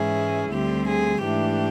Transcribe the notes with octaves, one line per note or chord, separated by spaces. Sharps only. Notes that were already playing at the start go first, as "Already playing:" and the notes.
Already playing: G#2 E3 G#3 C#4 E4 G#4
D2 D3 G3 C4 G4
G#4
G#2 E3 A3 D4 G4